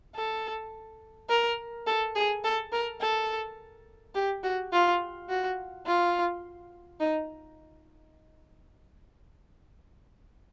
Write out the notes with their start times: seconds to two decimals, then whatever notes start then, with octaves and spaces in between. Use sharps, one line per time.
0.15 A4
1.29 A#4
1.87 A4
2.15 G#4
2.44 A4
2.72 A#4
3.01 A4
4.15 G4
4.44 F#4
4.72 F4
5.29 F#4
5.87 F4
7.00 D#4